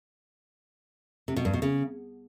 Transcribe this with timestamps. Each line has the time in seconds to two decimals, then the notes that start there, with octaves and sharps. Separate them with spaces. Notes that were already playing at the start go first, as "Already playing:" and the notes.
1.28 C3
1.36 B2
1.45 G2
1.53 B2
1.62 C#3